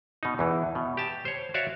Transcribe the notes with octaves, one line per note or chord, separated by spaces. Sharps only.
B2 D#4
E2 E3
B2
G4 A5
C5 C#5
F#4 C#5 D5 E5 F5